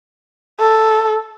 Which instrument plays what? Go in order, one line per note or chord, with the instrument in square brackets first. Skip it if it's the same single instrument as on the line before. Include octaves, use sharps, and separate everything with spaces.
[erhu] A4